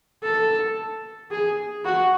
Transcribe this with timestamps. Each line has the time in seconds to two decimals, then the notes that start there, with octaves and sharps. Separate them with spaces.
0.23 A4
1.32 G#4
1.85 F#4